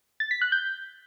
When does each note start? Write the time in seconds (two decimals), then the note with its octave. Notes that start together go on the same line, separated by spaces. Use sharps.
0.20 A6
0.31 B6
0.42 F#6
0.52 G6